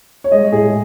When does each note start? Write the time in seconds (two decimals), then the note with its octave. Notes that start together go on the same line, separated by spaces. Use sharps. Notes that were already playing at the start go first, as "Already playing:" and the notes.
0.24 C#5
0.32 G#3 D#5
0.52 A2 G#4